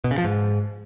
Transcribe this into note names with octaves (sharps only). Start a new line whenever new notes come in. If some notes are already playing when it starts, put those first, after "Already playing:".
B2
C#3
F3
G#2